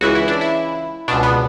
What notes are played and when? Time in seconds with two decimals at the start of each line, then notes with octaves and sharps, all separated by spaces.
0.01 C#2 C#3 E3 F#4
0.15 E4
0.28 D4
0.41 E4
1.08 C#2 B2 D4
1.23 B3